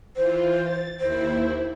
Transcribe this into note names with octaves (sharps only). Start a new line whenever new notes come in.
E3 F4 C5
A6
D#2 E4 C5